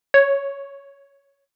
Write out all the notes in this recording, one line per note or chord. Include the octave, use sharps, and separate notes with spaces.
C#5